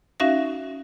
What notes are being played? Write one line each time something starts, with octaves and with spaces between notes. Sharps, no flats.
C#4 D#4 F#4 E5 F5 A#6